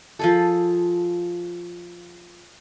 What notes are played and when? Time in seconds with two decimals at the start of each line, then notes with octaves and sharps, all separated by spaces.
0.19 F3 G#4 A4